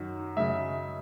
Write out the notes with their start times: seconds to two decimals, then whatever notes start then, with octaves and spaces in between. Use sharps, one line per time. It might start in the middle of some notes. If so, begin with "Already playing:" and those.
Already playing: F#2 D#3 F#3
0.37 F#2 C#3 G#3 E5